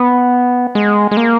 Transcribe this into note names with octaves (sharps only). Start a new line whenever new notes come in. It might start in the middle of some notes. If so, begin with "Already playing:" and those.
Already playing: B3
G#3
G#3
A#3